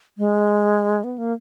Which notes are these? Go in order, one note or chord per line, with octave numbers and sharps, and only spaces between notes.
G#3
B3
A#3